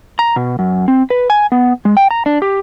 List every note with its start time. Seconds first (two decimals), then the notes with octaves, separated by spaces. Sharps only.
0.19 A#5
0.36 B2
0.59 F#2
0.88 C4
1.10 B4
1.30 G#5
1.52 B3
1.85 G#3
1.97 G5
2.11 A#5
2.26 D4
2.42 G4